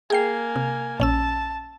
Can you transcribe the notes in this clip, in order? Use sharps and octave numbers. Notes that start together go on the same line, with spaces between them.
A#3 G#4 G5 G#5 C7
C3
A#1 C#4 A5 E6